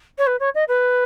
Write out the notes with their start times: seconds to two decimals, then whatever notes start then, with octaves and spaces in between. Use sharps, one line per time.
0.18 C#5
0.27 B4
0.40 C#5
0.54 D#5
0.68 B4